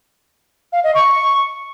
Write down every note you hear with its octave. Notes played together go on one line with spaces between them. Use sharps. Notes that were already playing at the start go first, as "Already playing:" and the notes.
F5
D#5
C#6